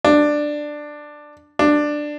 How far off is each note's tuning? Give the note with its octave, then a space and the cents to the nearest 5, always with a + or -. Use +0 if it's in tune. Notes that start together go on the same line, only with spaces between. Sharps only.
D4 +10
D4 +10